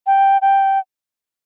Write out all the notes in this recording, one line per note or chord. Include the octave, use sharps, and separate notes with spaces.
G5
G5